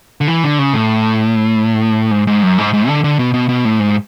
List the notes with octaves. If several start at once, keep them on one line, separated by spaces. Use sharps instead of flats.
D3
E3
D3
C#3
A2
G#2
G#2
F#2
G#2
G#2
D3
D3
B2
B2
B2
A2
G#2